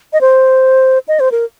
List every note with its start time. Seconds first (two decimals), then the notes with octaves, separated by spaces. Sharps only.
0.13 D#5
0.21 C5
1.08 D#5
1.20 C5
1.32 A#4